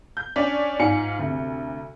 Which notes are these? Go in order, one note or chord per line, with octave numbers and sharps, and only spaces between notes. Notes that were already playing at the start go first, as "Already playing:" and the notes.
G6
C#4 D4 D5 B6
G#2 F4 G#5 C#7
D2 C3